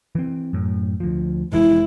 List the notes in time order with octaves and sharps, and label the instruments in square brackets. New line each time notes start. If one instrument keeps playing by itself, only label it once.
[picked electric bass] E3 C4
F#2 A2
D2 F3
[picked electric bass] F1 E3 G#3 [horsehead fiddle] E4